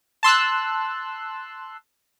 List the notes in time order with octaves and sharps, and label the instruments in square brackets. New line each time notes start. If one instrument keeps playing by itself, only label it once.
[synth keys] A5 C6 E6 F#6